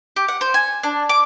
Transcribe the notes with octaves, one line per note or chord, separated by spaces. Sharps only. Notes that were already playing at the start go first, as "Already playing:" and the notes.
G4
F#5
C5
G#5
D4
D6